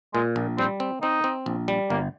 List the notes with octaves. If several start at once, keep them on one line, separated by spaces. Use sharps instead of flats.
A#2 G#3
A#1
G3 C4
C4
C4 D#4
C4
A#1
G3
G1 A#3